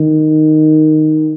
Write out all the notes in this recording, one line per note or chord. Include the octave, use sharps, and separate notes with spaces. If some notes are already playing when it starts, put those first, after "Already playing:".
Already playing: D#3